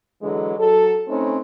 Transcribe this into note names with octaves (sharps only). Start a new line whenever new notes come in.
D3 E3 F#3 G#3
F#3 A4
A3 C4 C#4 D#4 B4